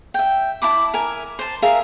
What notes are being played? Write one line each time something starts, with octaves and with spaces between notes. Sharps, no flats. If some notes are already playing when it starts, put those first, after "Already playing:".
E5 G5
E4 A5 B5 D6
A#4 E5 G#5
C5 A5
G#4 A#4 E5 F5